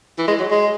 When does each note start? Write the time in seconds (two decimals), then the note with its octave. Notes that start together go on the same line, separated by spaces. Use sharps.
0.18 E3
0.28 G#3
0.40 F#3
0.51 G#3